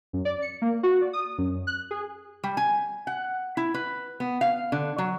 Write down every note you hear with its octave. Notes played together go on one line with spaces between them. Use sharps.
F#2
D5
C#7
A#3
F#4
D5
D#6
F#2
F#6
G#4
G3
G#5
F#5
E4
B4
B3
F5
D3
F#3